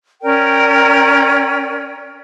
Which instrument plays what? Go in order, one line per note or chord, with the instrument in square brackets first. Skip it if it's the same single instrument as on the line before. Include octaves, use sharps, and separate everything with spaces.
[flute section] C#4 A#4 D5 G5